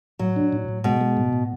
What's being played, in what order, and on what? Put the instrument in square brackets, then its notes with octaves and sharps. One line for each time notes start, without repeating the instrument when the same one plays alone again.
[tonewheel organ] A2 [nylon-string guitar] F#3
[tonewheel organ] D4
A2
A2
[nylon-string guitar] B2 [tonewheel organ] G#3
[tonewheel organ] G#3
A2
A2